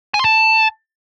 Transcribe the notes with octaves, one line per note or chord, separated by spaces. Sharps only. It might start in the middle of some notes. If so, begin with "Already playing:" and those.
G#5
C6
A5